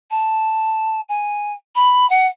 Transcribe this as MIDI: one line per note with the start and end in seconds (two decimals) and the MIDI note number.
0.10 1.00 81
1.08 1.52 80
1.75 2.08 83
2.09 2.27 78